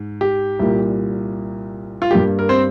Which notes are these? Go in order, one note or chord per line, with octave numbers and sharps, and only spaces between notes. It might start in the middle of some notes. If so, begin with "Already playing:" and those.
Already playing: G#2
G4
C2 A#2 G3 A#3
F4
G2 G3 A#3 G4
A#4
C4 C5